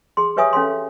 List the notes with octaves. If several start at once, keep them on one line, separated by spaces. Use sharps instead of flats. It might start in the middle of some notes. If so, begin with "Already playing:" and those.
G#4 C6
G4 B4 C#5 E5 G#5 D#6
C#4 A4 F5 G#5 C6